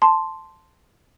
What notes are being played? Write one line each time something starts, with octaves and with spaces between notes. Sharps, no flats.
A5 C6